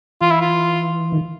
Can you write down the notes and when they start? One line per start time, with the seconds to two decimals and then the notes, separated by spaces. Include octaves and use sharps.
0.21 E3 F4
0.31 E4
0.41 F4
1.12 D#3